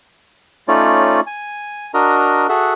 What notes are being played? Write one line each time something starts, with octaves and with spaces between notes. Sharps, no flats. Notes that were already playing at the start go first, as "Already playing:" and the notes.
A3 C#4 D#4 F4 C#5 D5
G#5
D4 F#4 A#4 D#5 A#5
F#4 G#4 A4 E5 F#5